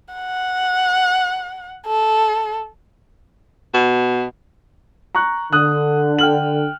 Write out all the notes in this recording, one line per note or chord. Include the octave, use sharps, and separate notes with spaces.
F#5
A4
B2
A#5 C#6 F#6
D3 D#6 F#6
G5 F6 F#7